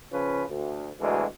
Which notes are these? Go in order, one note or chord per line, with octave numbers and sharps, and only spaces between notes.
C#3 F3 C#4 B4
D2
D2 B2 E3 G#3